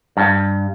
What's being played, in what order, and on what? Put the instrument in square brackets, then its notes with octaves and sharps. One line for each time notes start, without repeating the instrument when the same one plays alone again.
[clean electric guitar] G2